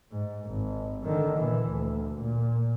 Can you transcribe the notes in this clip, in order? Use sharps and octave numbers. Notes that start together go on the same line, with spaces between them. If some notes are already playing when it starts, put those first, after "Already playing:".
G#2
G#1
D3 D#3
A#2 E3
D2
A#2